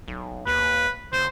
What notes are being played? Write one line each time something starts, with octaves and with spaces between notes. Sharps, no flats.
B1
D#2 B4
F#1 C5